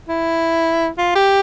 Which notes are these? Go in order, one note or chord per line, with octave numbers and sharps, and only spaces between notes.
E4
F4
G4